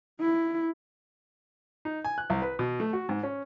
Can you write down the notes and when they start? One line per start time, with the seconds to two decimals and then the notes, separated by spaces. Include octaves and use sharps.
0.20 E4
1.85 D#4
2.04 G#5
2.18 F#6
2.30 C2
2.42 B4
2.59 B2
2.80 A3
2.93 F#4
3.09 G#2
3.23 C#4